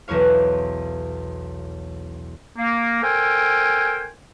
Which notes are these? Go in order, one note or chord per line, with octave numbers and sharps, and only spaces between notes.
B1 E2 B4 C#5 F5
A#3
A4 A#4 C5 G5 G#5